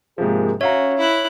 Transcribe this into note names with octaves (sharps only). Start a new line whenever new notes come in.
G#2 C3 F3 A#3 G#4
C#4 F#4 C#5 E5 F5 A#5
E4 F#6